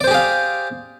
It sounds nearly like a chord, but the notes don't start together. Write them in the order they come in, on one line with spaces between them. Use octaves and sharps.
D5 C5 G4 G#4 F5